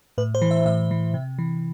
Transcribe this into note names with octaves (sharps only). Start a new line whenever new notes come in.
A2 B4
C5
E3
E5
A2 E5
E3
C3
E3